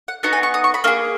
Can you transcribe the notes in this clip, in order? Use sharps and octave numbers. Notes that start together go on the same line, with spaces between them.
F#5
B3 D#4 F#4 A#5
G#5
C#6
D#6
C#6
B5
A#3 D#4 G#4